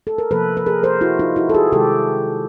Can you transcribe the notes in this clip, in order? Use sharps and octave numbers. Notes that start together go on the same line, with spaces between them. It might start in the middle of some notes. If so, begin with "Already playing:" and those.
A4
A#4
C3 F3 A#3 A4 B4
B4
G#4 A#4
A#4 C5
E4 F#4
D#4 F4
E4 F#4
A4
F#4 G#4
C3 D#3 G#3 G4 A4